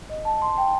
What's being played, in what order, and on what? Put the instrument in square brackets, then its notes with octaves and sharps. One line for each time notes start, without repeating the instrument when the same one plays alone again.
[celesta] D#5
A5
C6
G5